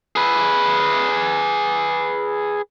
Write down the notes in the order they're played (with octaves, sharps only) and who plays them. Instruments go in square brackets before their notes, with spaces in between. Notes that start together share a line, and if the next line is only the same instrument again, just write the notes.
[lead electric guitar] G#4 B4